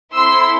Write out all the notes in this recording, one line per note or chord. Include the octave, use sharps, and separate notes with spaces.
C4 E4 A4 C6 E6